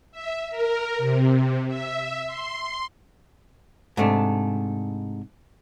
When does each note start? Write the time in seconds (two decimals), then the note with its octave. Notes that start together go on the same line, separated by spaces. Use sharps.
0.12 E5
0.50 A#4
0.98 C3
1.67 E5
2.26 C6
3.97 G#2 C3 A3 D4